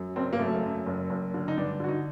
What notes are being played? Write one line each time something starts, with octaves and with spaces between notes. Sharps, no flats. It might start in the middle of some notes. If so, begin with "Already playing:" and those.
Already playing: F#2
F#1 C4
A#3
F#2 A3
F#2
F#1
F#1
D3
D#4
G2 D4
D3 F#4
D#4